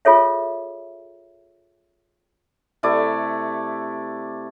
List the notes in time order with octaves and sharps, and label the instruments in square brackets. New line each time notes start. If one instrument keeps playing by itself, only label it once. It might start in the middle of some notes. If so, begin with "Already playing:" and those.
[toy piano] F4 G#4 A4 C#5 E5
[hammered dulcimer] C3 A3 E4 D5